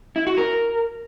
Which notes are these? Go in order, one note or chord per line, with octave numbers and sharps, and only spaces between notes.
E4
F#4
A#4